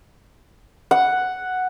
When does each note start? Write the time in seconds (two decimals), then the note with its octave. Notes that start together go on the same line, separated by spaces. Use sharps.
0.91 F#5